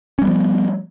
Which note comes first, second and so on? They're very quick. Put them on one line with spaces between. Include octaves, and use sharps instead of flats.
C#4 G3 B3 F3